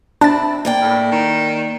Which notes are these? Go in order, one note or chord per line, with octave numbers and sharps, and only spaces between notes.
C4 D4 E4 A6
A#3 D5 G5
A2
D#3